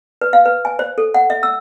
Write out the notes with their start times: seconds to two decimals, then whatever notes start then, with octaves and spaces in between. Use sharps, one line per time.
0.21 B4
0.33 F5
0.46 B4
0.65 G#5
0.79 C5
0.98 A4
1.14 F#5
1.30 E5
1.43 E6